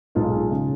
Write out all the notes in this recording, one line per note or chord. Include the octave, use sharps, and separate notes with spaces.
B1 A#2 G#3 F4 G#4
C#3